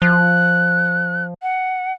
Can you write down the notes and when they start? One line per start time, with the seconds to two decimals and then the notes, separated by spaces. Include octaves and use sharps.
0.02 F3 F#6
1.42 F#5